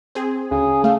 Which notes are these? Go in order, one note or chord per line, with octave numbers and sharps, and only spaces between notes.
C4 G#4
D2 C#3 G#4
A3 F5